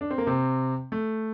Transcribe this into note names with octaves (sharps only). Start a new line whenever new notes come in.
D4
C4
A#3
C3 C4
A3